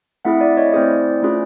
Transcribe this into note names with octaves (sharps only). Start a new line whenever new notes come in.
A3 C4 E4 G#4 E5 F#5
D5 E5
C#5 D#5
A3 C4 E4 G#4 C5 D5
A3 C#4 F4 G#4